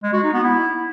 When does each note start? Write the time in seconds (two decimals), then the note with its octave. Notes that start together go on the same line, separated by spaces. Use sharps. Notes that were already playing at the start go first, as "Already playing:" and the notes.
0.03 G#3
0.13 F#4
0.23 D#4
0.33 B3
0.43 E4